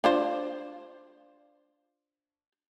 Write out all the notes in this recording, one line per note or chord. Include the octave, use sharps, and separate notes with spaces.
D4 F4 C5